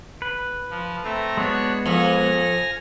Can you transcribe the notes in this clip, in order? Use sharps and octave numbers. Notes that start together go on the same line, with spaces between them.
B4
F3
A3 C4 A#5
G#3 B3 D4 F#4 C#5
F2 G#5 F6 A#6